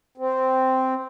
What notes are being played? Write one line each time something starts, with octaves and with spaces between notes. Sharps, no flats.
C4